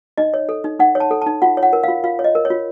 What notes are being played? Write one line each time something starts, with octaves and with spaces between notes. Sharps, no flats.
D#4 D#5
C#5
A4
D#4
D#4 F#5
C#5
A5
A4
D#4 A5
F4 F#5
C#5
F#5
A#4
F4 F5
F4 F5
C#5
D#5
A#4
C#5
F4